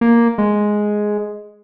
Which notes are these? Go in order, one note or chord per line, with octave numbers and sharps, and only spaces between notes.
A#3
G#3